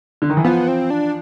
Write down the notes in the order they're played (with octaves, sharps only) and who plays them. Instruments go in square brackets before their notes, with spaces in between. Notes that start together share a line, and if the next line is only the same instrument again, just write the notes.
[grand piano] D3
D#3
E3
[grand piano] F3 [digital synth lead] B3
[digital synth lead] C4
D4